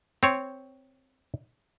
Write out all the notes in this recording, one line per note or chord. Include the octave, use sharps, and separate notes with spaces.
C4 C#5